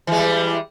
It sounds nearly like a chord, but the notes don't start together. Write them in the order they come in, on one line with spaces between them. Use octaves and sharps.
E3 G#3 G3